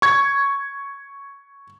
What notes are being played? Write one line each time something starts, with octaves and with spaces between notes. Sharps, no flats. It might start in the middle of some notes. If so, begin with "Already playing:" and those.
C#6 G#6